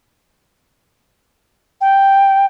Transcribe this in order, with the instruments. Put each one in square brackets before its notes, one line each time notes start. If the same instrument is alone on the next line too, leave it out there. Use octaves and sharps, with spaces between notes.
[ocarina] G5